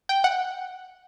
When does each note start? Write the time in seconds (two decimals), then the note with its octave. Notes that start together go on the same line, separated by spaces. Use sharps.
0.09 G5
0.24 F#5